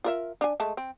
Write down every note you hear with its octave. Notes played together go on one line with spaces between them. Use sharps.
F4 A#4 E5
D4 G#5
G#3 A3 A5
C4